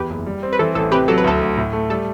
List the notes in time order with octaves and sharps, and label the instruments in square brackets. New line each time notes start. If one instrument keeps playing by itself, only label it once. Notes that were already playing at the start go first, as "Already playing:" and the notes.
Already playing: [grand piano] E2 [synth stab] G4 B4
[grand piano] F#1
G3
C4
[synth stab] B4
[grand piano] E3 [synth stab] A4
[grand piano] A1 [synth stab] A4
[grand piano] C3 [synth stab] G4 B4
[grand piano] F#3 [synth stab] A4
[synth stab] B4
[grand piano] D2 [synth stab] A4
[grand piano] D2
A2
A3
[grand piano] G3 [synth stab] A4